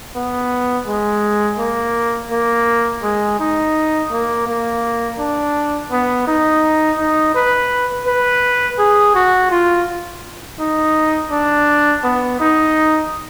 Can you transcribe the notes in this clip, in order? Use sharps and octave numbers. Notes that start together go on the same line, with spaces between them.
B3
G#3
A#3
A#3
G#3
D#4
A#3
A#3
D4
B3
D#4
D#4
B4
B4
G#4
F#4
F4
D#4
D4
B3
D#4